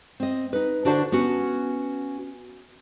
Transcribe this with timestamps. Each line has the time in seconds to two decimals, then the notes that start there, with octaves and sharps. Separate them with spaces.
0.20 C4 D#5
0.53 D#4 B4
0.85 D3 D4 F#4 C5 F5 A5
1.12 B3 C#4 F#4